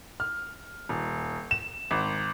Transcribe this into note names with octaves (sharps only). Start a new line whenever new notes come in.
F6
D#1
E7
G#1